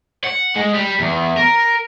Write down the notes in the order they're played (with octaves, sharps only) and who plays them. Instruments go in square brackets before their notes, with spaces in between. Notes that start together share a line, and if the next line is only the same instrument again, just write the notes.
[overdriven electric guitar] F#5
G#3
G3
E2
A#4